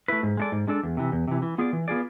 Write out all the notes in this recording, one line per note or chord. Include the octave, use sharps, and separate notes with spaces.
A3 E4 B4
G#2
G#3 D4 A4 D5
G#2
G#3 D4 A4 D5
E2
C3 E3
E2
C3 E3
E3
B3 F4 G#4 D5
E3
B3 F4 G#4 D5